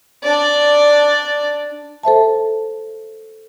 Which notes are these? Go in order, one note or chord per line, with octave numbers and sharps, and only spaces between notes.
D4 D5
A4 C5 E5 A5